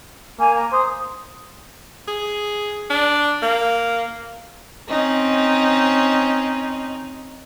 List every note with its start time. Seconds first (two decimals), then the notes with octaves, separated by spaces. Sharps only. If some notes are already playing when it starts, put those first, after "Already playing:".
0.39 A#3 G#5
0.55 A#5
0.72 C5 D#6
2.08 G#4
2.90 D4
3.43 A#3
4.89 C4 C#4 D#4